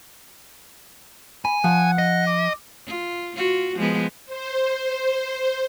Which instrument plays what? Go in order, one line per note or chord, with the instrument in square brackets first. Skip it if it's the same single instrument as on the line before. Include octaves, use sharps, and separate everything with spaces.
[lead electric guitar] G#5 [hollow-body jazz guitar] B5
[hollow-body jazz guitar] F3 [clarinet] F#5
[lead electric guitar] D#5
[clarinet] D6
[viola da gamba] F4
F4 F#4
F3 G#3 B3
[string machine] C5